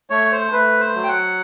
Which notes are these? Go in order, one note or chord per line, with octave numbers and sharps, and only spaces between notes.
A3 C#5
C5
A3 B4
C5
F#3
G5
F#5